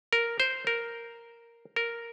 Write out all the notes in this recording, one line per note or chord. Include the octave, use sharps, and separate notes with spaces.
A#4
C5
A#4
A#4